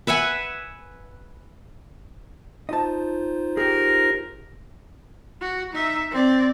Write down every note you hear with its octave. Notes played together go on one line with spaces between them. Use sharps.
B4 E5 F#5 G#5
D#4 F4 C5 D#5 A5
G4 G#4 A#4
F#4
D#4 E5
C4 D5